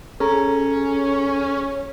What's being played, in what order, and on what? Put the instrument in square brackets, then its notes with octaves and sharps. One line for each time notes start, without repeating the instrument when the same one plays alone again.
[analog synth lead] C#4 [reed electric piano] G#4 A4 A#5